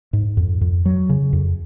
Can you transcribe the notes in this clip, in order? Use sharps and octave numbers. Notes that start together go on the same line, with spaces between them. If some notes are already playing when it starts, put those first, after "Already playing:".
G#2
F2
F2
F#3
C#3
F2